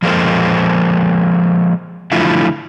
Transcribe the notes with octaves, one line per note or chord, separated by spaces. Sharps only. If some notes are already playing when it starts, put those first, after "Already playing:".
F3 G#3 A#3 A4 C5
D3 F3 F#3 A3 E4 F4